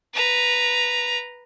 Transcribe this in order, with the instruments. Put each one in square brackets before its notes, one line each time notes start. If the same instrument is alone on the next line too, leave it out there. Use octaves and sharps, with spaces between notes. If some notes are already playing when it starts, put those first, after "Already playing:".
[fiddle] B4 A#5